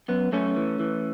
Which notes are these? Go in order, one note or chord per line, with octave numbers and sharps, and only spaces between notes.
F#2 B3
F#2 A3 C#4
E3
E3